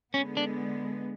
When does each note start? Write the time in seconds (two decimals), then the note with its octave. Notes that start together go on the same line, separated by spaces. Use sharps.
0.14 D3 G#3 B3 C#4
0.37 D4